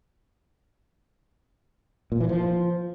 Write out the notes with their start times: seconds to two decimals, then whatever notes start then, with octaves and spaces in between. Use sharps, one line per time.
2.12 A#2
2.20 E3
2.29 F3